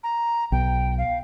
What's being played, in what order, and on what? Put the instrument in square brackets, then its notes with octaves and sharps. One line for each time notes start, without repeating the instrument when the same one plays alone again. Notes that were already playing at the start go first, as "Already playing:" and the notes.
[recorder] A#5
[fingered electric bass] B1 [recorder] G5
[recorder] F5